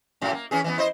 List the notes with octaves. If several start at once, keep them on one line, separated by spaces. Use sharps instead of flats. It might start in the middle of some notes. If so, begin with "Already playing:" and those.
F#2 A2 F#3
A#3
E3 C#4 G#4
E3 G3 B3
E4 C5 D#5